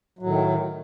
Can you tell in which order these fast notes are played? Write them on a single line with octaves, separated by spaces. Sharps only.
F#3 A2 D#3